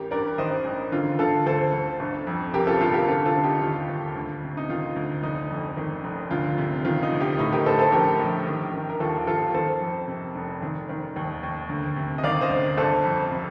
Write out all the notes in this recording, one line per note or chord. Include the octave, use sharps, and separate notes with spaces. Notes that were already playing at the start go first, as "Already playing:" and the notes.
Already playing: A1 G4 A#4
G2 A#4 D5
D#3 C5 D#5
A1
D3 F4
D3 F4 A4
D2 A4 C5
D2
G1
F2
C3 G4 A#4
F4 A4
G1 F4 A4
G4 A#4
D3 F4 A4
F4 A4
D3
D#4 G4
D#2 F4
D#2
D2
C3
D#4
D#3 F4
D2
F1 D#4
F2
D#3
F1
D2 F4
C3
D#3 F4
D#4
D2
D#4 G4
A2 D#4
G4 A#4
A2 A4 C5
A4 C5
A#1 G4 A#4
A#1
D#3
D#3
A#4
D#2 F4 A4
D#2 F4 A4
D#3 A4 C5
F2
C3
F1
D#3
D#3
D#2
D#2
D2
C3
D#5
D#3 D5 F5
C5 D#5
D2
G1 A4 C5
F2
C3